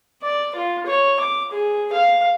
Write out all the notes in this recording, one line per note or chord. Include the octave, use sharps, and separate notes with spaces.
D5
F4
C#5
D6
G#4
F5